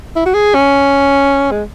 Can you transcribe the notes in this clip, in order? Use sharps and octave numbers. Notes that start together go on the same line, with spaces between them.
E4
F#4
G#4
C#4
G#3